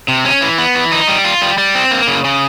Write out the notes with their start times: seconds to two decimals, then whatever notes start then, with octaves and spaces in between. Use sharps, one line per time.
0.08 C3
0.25 C#4
0.42 E3
0.58 B3
0.75 E3
0.92 D#4
1.08 G3
1.25 F4
1.42 G3
1.58 G3
1.75 C4
1.91 A#3
2.08 C#3
2.24 C#3